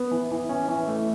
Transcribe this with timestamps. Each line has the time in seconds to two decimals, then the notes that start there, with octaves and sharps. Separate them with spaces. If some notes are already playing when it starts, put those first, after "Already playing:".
Already playing: B3
0.11 E3
0.31 E3
0.49 C#4
0.68 E3
0.88 A3